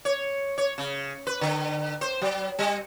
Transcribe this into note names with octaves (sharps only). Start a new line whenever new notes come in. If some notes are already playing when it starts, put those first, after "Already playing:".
C#5
C#5
C#3
B4
D3
C5
F#3
G3